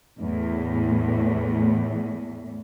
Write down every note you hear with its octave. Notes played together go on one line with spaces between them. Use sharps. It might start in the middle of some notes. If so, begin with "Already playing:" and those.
E2 A2